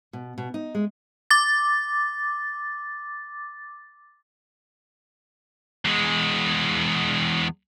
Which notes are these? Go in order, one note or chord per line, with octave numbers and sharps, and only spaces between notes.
B2
B2
D#4
G#3
D6 A6
E2 G#3